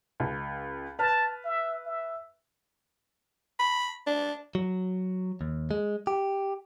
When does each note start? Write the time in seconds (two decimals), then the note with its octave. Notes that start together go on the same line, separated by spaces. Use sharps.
0.20 C#2
0.99 B4 A5 F6
1.44 E5
1.86 E5
3.59 B5
4.07 D4
4.55 F#3
5.41 D#2
5.71 G#3
6.07 G4